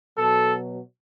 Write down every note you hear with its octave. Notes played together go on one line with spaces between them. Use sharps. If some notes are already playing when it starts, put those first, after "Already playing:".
B2 F#3 A4